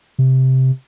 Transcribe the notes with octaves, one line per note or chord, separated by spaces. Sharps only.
C3